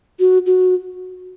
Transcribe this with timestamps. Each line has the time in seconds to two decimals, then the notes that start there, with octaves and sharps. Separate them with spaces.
0.20 F#4
0.46 F#4